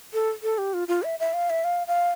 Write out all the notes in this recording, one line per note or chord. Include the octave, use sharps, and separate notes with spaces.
A4
A4
G4
F4
F4
E5
E5
F5
E5
F5
F5